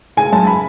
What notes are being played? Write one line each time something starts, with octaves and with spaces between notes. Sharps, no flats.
C#3 G#5
F#2 A5
B5